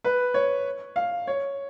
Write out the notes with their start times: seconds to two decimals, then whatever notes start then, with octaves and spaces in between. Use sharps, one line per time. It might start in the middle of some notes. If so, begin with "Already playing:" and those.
0.04 B4
0.34 C#5
0.96 F5
1.27 C#5